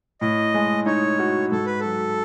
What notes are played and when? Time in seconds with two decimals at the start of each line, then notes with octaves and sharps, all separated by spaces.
0.21 A2 D#5
0.54 G#3
0.86 D#4 C#5
1.19 F#4
1.52 G#2 A4
1.66 B4
1.80 F#3 A4